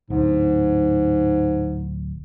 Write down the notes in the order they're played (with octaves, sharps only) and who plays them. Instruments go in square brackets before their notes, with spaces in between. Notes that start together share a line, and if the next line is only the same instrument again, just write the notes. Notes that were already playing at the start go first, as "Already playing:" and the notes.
[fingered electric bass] D1 [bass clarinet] G#2